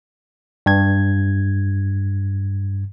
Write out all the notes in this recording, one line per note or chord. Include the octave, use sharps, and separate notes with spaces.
G2 G#6